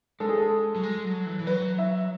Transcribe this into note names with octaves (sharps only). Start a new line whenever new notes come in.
G#3 A4
G#4
A4
F#3
G#3
F#3
E3
E3
F#3 B4
E5